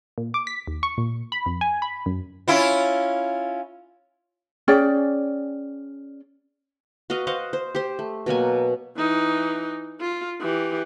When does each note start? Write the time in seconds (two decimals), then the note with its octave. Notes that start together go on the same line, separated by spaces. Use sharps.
0.18 A#2
0.34 D6
0.47 B6
0.67 D#2
0.83 C#6
0.98 A#2
1.32 B5
1.46 F2
1.61 G#5
1.82 B5
2.06 F#2
2.48 C#4 E4 F4
4.68 C#4 G#4 D5 G5
7.10 F#4 B4 D#5 F5
7.27 C5 D#5 F5 F#5
7.53 C5
7.75 G4 C5
7.99 A3
8.26 B2 F#3 A#3 G#5
8.97 E3 D#4
10.00 F4
10.41 E3 G4